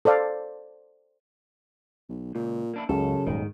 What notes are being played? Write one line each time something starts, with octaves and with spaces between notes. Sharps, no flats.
A4 C5 D5 F5
B1
C#2 A#2
A#3 D4 E4
C#2 F#2 C#3 A4
D#1 G#2 D#3